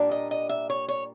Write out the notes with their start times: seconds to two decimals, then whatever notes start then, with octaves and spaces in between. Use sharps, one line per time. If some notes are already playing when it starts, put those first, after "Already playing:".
Already playing: A#2 G3 A#3 D4
0.11 D#5
0.31 D#5
0.49 E5
0.70 C#5
0.88 C#5